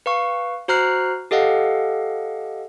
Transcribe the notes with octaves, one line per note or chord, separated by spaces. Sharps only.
B4 F5 C#6
F#4 C5 A#5 F6 F#6 C7
G4 A4 D#5 F5 F#5